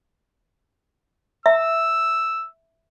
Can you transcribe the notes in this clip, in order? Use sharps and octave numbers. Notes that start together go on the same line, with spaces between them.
E5 E6